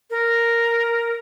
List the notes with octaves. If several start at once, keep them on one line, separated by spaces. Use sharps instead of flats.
A#4